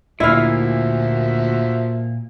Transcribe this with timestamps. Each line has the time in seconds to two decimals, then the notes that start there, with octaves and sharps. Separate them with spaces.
0.20 D2 A#2 F3 A#3 E4 F#4 E5 F5